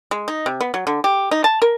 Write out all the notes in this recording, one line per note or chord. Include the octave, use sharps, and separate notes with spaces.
G#3
D#4
C3
B3
F#3
D3
G4
D#4
A5
A#4